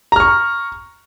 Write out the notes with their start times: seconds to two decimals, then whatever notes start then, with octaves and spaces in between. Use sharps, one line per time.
0.12 A#5
0.16 F6
0.20 C#6